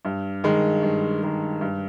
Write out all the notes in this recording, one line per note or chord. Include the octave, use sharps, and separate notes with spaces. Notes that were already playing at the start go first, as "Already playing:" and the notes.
G2
D#3 G#3
G2
D#3 G#3
G2